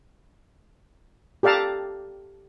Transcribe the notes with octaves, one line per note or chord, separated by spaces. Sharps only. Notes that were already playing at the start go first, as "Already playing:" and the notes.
G4 A4 D5 F5 A5 A#5